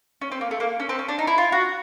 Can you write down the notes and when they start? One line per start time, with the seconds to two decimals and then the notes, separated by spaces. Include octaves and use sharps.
0.21 C#4
0.32 C4
0.41 A#3
0.51 A3
0.60 A#3
0.80 C#4
0.89 C4
0.99 C#4
1.09 D4
1.19 D#4
1.27 E4
1.38 F4
1.52 F#4